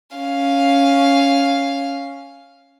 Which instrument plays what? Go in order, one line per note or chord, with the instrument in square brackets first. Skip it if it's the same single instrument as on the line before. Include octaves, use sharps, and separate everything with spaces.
[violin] C#4 F5